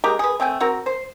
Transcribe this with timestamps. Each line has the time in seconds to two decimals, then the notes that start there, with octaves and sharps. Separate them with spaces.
0.04 G#3 A#3 G4 A#4
0.19 G#4 B4
0.40 A3 C4 G5 G#5
0.60 C4 F#4 A#4
0.86 C5